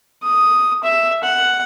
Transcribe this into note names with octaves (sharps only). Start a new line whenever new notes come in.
D#6
E5
F#5